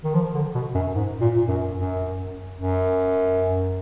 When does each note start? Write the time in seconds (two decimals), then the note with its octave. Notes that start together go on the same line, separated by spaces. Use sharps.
0.04 D#3
0.14 F3
0.34 D3
0.55 B2
0.74 F#2
0.95 G#2
1.21 A#2
1.48 F#2
1.75 F#2
2.55 F#2